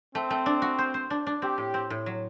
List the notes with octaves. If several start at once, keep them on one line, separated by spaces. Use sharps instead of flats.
A3 C4
A3
D4
F#4
C5
C5
D4
D4
C4 G4
A2
C4
A2
F#3